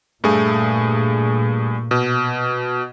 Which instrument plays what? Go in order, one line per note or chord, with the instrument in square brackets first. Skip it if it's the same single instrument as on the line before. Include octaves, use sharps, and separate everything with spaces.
[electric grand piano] G2 A3 G#4 [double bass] A#2
[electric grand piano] B2